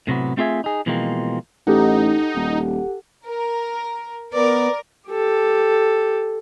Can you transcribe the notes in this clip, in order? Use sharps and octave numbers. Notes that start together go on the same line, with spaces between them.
A2 C3 F#3 B3
A3 C4 F4 G#4 E5 G#5
D#4 G#4
B2 E3 F3 G#3 A#3 C4
A1 D#4 G4 A4 F#5
D#1
A#4
B3 A#4 D5
G4 A4